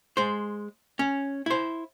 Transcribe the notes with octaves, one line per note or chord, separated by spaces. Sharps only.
G#3 C5
C#4
E4 C5